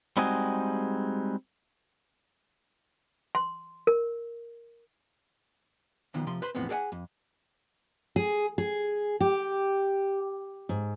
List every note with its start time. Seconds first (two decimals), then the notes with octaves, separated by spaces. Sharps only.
0.17 G3 G#3 C4 D#4 F#4 G#4
3.35 C6
3.87 A#4
6.14 B1 B2 D#3 F3
6.27 C3 F3 C6
6.42 B4 C5 B5 C6
6.55 E2 A2 F3 B3 C4
6.69 G#4 A4 D5 F#5 G#5
6.92 F2
8.16 G#4
8.58 G#4
9.20 G4
10.69 G#2